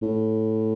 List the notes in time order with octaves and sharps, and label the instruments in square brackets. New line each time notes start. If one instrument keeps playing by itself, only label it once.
[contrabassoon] A2